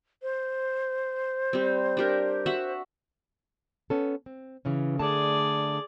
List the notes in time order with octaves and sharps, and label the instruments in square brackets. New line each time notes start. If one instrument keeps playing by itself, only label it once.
[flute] C5
[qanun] G3 C4
D4 G4 A#4
F#4 E5 F#5
[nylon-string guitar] B3 C#4 A4
C4
C#3 E3 C#4
[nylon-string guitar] D3 A3 A5 [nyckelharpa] G#4 D5